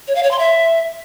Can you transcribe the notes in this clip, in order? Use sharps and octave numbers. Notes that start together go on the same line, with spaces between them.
C#5
F5
C#5
C6
E5